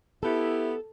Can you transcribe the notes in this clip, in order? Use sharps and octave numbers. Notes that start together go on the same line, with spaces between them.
B3 E4 G4 A4